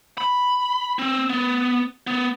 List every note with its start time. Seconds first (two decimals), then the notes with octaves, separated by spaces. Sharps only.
0.18 B5
0.99 C4
1.30 B3
2.07 B3